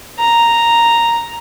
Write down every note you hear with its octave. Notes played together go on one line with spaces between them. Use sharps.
A#5